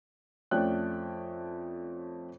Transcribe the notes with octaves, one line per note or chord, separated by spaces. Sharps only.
F2 A3 C#4 D5 G5 F#6